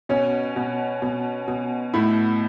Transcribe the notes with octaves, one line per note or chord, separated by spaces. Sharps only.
B2 C#4
B2
B2
B2
A2 E4